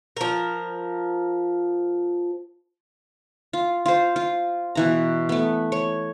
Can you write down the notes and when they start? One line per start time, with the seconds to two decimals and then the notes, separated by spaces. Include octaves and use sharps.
0.17 F3 A#4
3.53 F4
3.86 F4 C5
4.16 F4
4.75 B2 E3 A#5
5.29 A3 B3
5.72 C#5